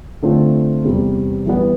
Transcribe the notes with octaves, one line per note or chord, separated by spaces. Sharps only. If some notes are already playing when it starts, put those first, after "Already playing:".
D3 A3 C4 F4
E2 C3 G3
E3 G3 B3